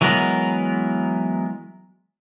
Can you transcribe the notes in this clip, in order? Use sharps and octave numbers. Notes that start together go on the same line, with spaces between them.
E3 F#3 G#3 B3 A#4